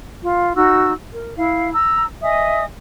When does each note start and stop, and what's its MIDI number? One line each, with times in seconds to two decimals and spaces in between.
0.23 0.54 65
0.55 0.92 63
0.55 0.92 66
0.55 0.92 88
1.12 1.34 70
1.36 1.71 64
1.36 1.71 77
1.72 2.04 82
1.72 2.04 88
2.22 2.64 75
2.22 2.64 76
2.22 2.64 80
2.22 2.64 87